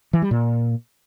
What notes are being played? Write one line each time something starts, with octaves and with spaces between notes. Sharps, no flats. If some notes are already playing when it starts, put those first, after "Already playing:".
E3
G3
A#2